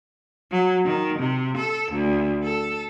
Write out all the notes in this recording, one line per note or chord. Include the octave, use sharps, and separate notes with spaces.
F#3
D#3
C3
A4
D2
A4